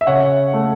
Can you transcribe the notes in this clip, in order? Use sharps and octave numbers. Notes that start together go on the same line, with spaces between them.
E5
C#3 C#5 F#5
A3